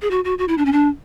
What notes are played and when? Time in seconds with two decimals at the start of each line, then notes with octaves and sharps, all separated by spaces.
0.02 G#4
0.11 F#4
0.25 F#4
0.38 F#4
0.48 E4
0.58 D4
0.65 C#4
0.72 D4